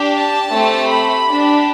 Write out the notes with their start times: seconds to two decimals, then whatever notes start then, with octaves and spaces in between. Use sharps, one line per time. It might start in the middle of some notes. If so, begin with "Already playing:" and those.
Already playing: D4 G4
0.14 A5
0.52 A3 C4 G4
0.89 B5
1.27 D4 G4